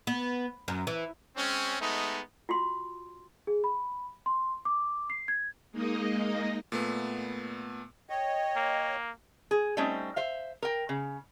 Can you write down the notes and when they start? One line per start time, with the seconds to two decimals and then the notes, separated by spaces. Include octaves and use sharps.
0.07 B3
0.68 F#2
0.87 E3
1.36 G#3 C4 C#4
1.79 G#3 A3 B3 D#4
2.49 F4 F#4 C6
3.47 G#4
3.64 B5
4.26 C6
4.65 D6
5.10 C7
5.28 G#6
5.72 G#3 A#3 D#4 D#5
6.72 A#2 A3 B3
8.10 C#5 D#5 G5
8.56 A#3
9.51 G#4
9.77 G3 A3 C4 C#4 D#4
10.16 C5 E5 F5
10.62 A#4 G5
10.89 C#3